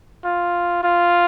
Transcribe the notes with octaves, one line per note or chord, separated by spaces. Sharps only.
F4
F4